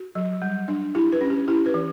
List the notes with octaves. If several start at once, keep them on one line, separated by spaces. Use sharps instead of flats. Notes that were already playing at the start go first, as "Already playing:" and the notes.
Already playing: F#4
F#3
G3
D4
E4 G4
B4
C#4
G4
E4 G4
B4
E3